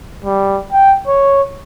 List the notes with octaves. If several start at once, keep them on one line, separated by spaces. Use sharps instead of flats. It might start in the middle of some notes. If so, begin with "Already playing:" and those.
G3
G5
C#5